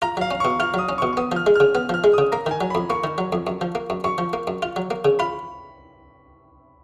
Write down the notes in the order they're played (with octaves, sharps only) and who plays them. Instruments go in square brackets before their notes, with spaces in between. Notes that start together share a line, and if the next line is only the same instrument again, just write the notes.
[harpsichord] F4 [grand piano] A#5
[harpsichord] F#3 [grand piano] F5
[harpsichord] C#4
[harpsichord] B2 [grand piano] C#6
[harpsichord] F4 [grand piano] F6
[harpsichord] F#3 [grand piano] D#6
[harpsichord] C#4
[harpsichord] B2 [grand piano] C#6
[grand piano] C#6
[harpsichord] B3 [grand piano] D#6
[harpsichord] F3 [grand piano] F6
[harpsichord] G#3
[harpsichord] C#3 [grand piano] F6
[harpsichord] B3 [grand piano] F6
[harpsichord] F3 [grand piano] F6
[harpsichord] G#3
[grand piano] D#6
[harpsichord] C#3
[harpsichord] A#3 [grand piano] A#5
[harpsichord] D#3 [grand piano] G#5
[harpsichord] F#3
[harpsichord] F2 [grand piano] B5
[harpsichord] A#3 [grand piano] C#6
[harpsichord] D#3
F#3
F2
F#2
F3
A#3
F#2
[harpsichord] F#2 [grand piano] C#6
[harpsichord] F3
A#3
F#2
F4
F#3
A#3
C#3
[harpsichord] F4 [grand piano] B5